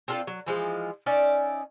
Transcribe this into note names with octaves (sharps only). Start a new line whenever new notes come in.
C4 D4 F4 A4
F#3
E3 F3 G#3
C#4 D#4 D5 E5